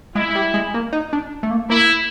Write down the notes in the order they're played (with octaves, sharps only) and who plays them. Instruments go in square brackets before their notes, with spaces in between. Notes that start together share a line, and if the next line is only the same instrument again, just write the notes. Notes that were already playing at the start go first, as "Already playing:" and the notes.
[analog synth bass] G#3 [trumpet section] E4
[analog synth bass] G3
G#3
A#3
D#4
D4
A3
A#3
[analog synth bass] A#3 [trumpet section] E4